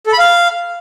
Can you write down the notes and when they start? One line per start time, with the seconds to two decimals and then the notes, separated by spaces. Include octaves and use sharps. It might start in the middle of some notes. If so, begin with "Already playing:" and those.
0.07 A4
0.13 B5
0.19 F5